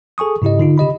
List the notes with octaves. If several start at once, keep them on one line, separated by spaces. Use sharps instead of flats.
G#4 A4 G#5 C#6 D#6
G#2 C#3 E4 G4 D#5
D3 D#4 F4
C#3 G4 D#5 B5